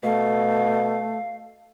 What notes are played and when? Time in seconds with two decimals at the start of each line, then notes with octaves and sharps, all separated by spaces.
0.03 B2 A3 F5